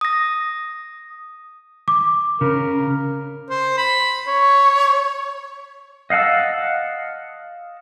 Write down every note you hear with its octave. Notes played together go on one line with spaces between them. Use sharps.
D#6 A#6
D6
C#3 A#4
C5
B5
C#5
D#5 F5 F#5 A5 E6